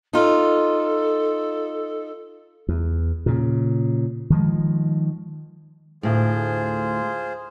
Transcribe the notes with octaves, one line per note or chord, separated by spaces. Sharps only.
D#4 F4 A4
E2
A#2 C#3
D#3 F3 G#3
D2 A2 F4 G#4 C5